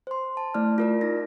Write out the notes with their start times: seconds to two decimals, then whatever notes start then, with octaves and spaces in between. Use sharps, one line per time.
0.07 C5 C6
0.37 A5
0.54 A3 E4 D5 F6
0.78 F4 A#4 D5
1.01 D#4 A#6